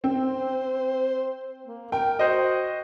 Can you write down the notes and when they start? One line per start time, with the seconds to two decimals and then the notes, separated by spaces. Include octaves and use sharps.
0.04 C4 C5
1.66 A#3
1.92 A#4 G5
2.19 F#4 C5 D#5